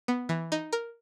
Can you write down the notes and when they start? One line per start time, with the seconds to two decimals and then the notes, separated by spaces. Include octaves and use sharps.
0.08 B3
0.29 E3
0.52 D#4
0.73 A#4